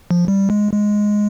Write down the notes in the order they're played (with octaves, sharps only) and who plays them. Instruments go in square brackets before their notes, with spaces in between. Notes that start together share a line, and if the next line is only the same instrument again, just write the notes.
[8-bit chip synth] F3
G3
G#3
G#3